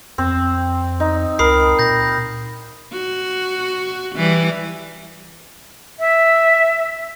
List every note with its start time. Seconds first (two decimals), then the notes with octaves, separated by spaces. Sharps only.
0.18 F2 C4
1.00 D#4
1.39 C#2 A#4 B5 D#6 C7
1.79 A#2 G6 A#6
2.92 F#4
4.15 E3 G3
5.99 E5